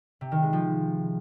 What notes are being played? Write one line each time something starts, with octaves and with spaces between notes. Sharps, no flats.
C3
D#3
G#3
F3